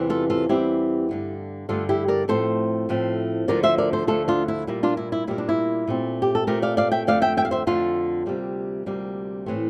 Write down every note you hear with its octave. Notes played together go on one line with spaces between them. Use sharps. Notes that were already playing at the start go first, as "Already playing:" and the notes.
Already playing: E2 C3 E3 G3 C4
F4 A4
F4 A4
E2 C3 E3 G3 C4 E4 G4
G2 D3 A3
G2 D3 A3 F4 A4
E4 G4
A#4 D5
A2 F3 A3 C4 A4 C5
A2 F3 A3 C4
D2 D3 F3 A3 A#4 D5
C5 E5
A#4 D5
A4 C5
D2 D3 F3 A3 F4 A4
D4 F4
E4
A#2 G3 A#3 E4
D4 F4
E4
E4
A#2 G3 A#3 E4
D4
E4
A#2 A3 C4
G4
A4
A#2 A3 C4 G4 A#4
D5 F5
D5 F5
E5 G5
F2 D3 A3 D5 F5
E5 G5
E5 G5
F5
C5 E5
F2 D3 A3 F4 A4
D2 C3 G3 A#3
D2 C3 G3 A#3
A2 E3 A3 C4